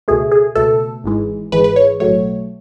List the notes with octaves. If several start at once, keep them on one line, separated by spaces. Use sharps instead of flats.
C#2 B2 A3 G#4
G#4
C#2 B2 A3 A4
G#1 G#2 E3 G#3
G#1 G#2 E3 G#3 B4
B4
C#5
B1 A2 F#3 A3 C#5